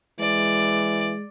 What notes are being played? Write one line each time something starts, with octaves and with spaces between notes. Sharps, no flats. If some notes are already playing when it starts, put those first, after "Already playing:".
E3 G#3 D5